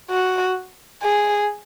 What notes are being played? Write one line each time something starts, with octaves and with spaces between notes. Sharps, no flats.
F#4
G#4